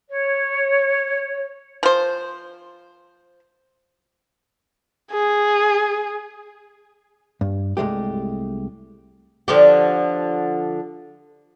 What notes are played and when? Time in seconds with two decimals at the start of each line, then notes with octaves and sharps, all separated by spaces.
0.10 C#5
1.83 F3 C5
5.12 G#4
7.41 G2
7.77 C2 G#3 A3 G4
9.48 D3 F3 G4